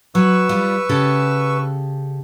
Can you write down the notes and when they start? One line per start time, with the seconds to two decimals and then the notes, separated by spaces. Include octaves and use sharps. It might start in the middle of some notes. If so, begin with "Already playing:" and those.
0.15 F#3 B4 C#6 E6
0.49 G3 F4
0.89 C#3 G4 A4